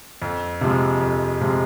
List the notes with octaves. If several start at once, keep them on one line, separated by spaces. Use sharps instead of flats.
F2
C3 F3 G#3
F2
C3 F3 G#3